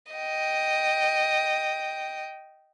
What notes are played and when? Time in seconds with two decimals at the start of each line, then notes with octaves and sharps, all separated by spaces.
0.13 D#5 G5